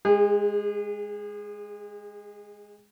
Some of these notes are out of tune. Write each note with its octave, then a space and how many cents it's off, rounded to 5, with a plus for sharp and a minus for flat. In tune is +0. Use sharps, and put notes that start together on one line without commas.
G#3 +0 G#4 -40